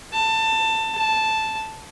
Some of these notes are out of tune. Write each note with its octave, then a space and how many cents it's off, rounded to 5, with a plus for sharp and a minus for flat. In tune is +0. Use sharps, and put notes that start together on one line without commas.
A5 +20
A5 -5